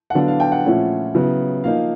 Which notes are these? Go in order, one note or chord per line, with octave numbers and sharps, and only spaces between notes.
F#5
D3 F#3 B3 D4 F5
F5
G5
F#5
A#2 F3 A3 C#4 E4
C#3 F#3 B3 E4
F3 A#3 D#4 F5